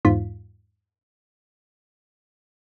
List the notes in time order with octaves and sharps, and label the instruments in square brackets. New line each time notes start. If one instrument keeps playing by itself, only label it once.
[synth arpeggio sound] E2 G#2 F4 B6